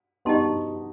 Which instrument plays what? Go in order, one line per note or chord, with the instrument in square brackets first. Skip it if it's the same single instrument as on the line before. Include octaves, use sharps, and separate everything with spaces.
[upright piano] B3 D#4 [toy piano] G4 D#5 A5 C6